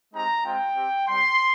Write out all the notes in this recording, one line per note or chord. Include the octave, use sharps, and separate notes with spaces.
G#3 C4 D#4 G4 A#5
G#3 C4 F4 G5
C4 G4
G3 C4 G4 C6